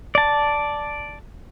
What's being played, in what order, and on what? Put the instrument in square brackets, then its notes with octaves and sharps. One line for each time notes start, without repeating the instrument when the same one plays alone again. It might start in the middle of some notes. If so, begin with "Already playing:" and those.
[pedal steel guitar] D5 A5